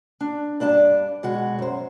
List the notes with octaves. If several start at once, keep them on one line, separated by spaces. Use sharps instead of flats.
D4
G2 D4 D5 A5
B2 G#3 F#4
F#2 C5